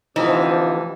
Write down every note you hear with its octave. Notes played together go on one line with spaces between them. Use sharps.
D2 C3 E3 F3 D#4